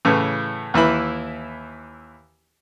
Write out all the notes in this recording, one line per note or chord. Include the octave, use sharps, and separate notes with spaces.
A2 C#3 E3
D#2 E3 E4 B5